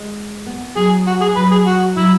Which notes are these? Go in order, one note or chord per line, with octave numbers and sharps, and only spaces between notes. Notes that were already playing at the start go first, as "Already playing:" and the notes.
Already playing: G#3
B3
F#3 G#4
F#4
G#4
F#3 B4
G#4
F#4
F#3 E4